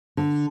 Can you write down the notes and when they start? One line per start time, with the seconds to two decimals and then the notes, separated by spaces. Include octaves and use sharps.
0.17 D3